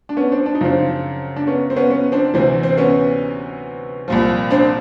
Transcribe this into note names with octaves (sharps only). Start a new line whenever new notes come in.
D4
B3 C#4
C4 D4
D4
D#4
F#2 C#3 F3 C4 D4
D4
B3 C#4
C4
B3 C#4
B3 C#4
C4 D4
D2 C3 E3 C4
C4
B3 C#4
C2 A#2 F3
C4 D4